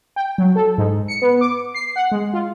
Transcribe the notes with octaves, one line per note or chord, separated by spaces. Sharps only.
G5
F#3
A4
G#2
C#7
B3
D6
C7
F#5
G#3
F4